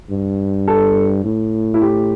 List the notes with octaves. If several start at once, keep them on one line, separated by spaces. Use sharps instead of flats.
G2
A4
A2
E4
G4